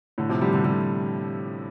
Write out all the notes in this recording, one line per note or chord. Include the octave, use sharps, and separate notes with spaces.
A2 D3
C3 F3
D3 G3
D3 G3
D3 G3